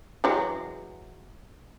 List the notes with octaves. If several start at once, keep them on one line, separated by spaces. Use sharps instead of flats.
E3 F#3 G#3